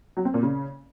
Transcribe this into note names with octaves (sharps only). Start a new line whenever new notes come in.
F#3
C4
A#2
C#3